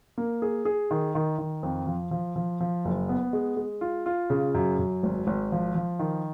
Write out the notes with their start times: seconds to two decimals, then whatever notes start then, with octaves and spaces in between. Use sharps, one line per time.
0.18 A#3
0.42 G#4
0.65 G#4
0.91 D#3
1.15 D#3
1.38 D#3
1.63 F2
1.87 F3
2.11 F3
2.36 F3
2.60 F3
2.85 F#1
3.09 B3
3.33 G#3
3.57 G#3
3.81 F4
4.06 F4
4.30 C#3
4.54 F#2
4.79 F#2
5.03 G#1
5.27 G#1
5.52 F3
5.75 F3
5.99 D#3